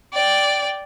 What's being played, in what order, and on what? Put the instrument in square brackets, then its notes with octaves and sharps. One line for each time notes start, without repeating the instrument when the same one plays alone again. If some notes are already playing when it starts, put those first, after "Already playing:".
[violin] D5 G5